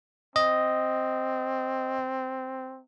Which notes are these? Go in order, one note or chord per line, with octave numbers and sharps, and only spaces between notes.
C4 D#5